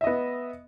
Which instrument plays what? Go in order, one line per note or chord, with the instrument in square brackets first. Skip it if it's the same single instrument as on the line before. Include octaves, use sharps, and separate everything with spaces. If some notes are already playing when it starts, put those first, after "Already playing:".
[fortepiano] E5
D#5
B3